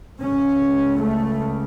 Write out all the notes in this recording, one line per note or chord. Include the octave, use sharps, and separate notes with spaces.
C#2 C#3 C#4
A3